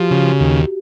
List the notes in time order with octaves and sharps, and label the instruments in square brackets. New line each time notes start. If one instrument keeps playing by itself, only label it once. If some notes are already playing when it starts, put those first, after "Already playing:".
Already playing: [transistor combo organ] F3 [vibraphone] F#4 G4
[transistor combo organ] C#3
D#2